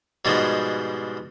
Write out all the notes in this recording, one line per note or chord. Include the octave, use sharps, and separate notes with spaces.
G#2 B2 F3 G3 G#3